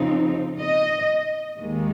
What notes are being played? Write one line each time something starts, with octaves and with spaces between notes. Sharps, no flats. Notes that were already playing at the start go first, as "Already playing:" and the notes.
Already playing: F2 C#3 F3 C4 D#4
D#5
D#2 D#3 G#3